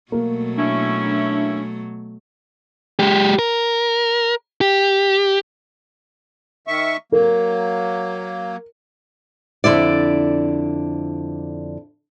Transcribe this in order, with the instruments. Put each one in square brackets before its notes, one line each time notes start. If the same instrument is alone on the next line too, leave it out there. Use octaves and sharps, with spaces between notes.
[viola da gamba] B2 F#3 A3 [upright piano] A#3
[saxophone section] C#4 E4 [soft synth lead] D4
[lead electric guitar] G#3 G4
A#4
G4
[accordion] D#3 E5 C#6
[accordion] F#3 A#3 [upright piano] A#4
[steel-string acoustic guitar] F2 D3 E4 D5